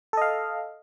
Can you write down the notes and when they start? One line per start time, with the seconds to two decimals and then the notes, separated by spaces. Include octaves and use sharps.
0.13 A4
0.17 D#5
0.22 F5